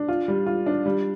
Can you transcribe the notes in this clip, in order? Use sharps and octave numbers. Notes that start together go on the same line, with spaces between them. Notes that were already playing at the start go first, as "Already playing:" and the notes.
Already playing: D4
F4
G3
F4
D4
G3